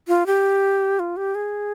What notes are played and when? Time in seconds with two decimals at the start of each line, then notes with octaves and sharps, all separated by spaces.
0.08 F4
0.26 G4
0.99 F4
1.17 G4
1.35 G#4